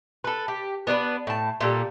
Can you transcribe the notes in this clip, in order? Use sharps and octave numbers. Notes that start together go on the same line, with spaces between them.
A4 B4
G4
B3 D4 A#4 B4
A2 A5
A#2 G3 A4